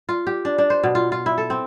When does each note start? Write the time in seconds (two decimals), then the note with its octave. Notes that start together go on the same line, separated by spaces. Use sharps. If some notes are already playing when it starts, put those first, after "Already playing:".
0.09 F4
0.27 G4
0.45 D4
0.58 D4
0.70 C5
0.83 B2
0.95 F4
1.12 F4
1.26 E4
1.38 A4
1.50 C4